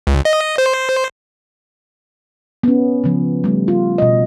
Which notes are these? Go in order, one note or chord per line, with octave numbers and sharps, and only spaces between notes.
C#2
D#5
C5
B3 C#4
C#3 F3
G3 A3
F4
B2 D#5